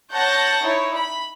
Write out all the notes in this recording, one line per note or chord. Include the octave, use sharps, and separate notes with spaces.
C#5 F#5 A5 G6 A6 A#6
D#4 E4 C#5
B5